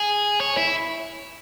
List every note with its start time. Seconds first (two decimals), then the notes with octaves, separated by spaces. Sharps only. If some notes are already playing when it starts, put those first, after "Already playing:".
Already playing: G#4
0.41 C#5
0.57 E4